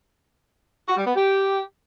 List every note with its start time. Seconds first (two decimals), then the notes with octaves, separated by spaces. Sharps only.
0.88 F#4
0.97 G3
1.06 B3
1.15 G4